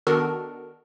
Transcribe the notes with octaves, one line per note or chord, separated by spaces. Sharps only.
D#3 B3 D4 F#4 A4 A#4